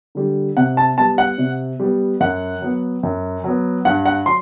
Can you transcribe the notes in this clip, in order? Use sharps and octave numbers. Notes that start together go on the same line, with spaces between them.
D3 G3
C3 F#5
A5
G3 B3 A5
F#5
C3
G3 B3
F#2 F#5
F#3 B3
F#2
F#3 B3
G2 F#5
F#5
F#3 C6